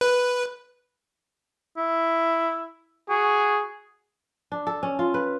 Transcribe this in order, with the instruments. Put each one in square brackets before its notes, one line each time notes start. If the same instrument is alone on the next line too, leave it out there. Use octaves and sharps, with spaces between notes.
[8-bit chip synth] B4
[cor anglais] E4
[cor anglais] F#4 [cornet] G#4
[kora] D4
A4
C#4
F4
B4